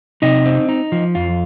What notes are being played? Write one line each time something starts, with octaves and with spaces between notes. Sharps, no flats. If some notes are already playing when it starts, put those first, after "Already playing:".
C3 D#4 D#5
C4
D#4
F3
F2 F4